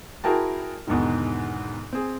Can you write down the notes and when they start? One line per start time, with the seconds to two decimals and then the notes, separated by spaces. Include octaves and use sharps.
0.24 E4 F#4 G#4 A#4 G5 A5
0.87 E2 G#2 B2 D3 D#3
1.93 C4 G#4